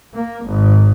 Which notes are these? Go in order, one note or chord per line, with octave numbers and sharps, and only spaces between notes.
A#3
G#1